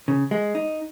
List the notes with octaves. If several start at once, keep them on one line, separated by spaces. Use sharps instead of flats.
C#3
G#3
D#4